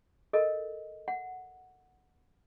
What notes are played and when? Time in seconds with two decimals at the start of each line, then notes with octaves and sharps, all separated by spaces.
0.33 A4 A#4 D#5
1.08 F#5